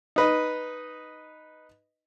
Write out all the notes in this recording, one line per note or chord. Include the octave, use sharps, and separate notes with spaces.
D#4 B4 D#5